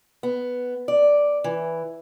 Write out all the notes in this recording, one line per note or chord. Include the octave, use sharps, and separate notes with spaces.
B3
D5
E3